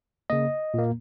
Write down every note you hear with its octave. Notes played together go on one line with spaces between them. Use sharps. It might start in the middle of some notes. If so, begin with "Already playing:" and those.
C#3 A#3 D#5
A#2 A#3